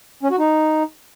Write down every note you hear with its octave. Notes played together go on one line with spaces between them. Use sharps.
C#4
F#4
D#4